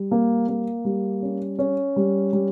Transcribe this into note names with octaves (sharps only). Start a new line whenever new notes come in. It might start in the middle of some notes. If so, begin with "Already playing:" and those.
Already playing: G3
A#3
A#3
G3
C#4
C#4
G3
G3